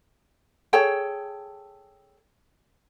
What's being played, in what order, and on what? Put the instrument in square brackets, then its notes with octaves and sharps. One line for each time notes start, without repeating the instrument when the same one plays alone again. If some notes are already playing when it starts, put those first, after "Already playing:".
[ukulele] G#4 A4 C#5 G5